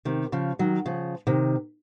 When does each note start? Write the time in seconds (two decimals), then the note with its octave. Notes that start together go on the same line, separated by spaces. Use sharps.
0.05 C3 D#3
0.32 C#3 F3
0.59 D#3 F#3
0.86 C#3 F3
1.27 C3 D#3